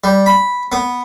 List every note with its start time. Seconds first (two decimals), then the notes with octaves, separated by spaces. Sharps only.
0.04 G3
0.26 B5
0.72 B3